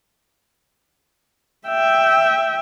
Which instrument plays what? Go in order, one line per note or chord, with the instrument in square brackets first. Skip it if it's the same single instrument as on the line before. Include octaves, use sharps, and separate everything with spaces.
[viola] E5 G5